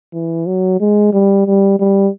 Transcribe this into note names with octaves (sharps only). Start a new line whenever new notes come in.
E3
F#3
G#3
G3
G3
G3